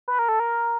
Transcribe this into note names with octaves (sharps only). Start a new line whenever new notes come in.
B4
A#4
A4
A#4